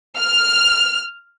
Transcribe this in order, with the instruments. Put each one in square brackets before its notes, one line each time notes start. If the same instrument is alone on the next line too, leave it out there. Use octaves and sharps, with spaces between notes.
[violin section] F6